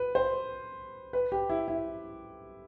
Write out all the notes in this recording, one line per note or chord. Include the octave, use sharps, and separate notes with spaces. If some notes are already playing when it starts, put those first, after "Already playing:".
Already playing: B4
C5
B4
G4
E4
E4